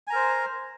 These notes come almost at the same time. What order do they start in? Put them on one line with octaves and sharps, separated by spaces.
G#5 A#5 A#4 C5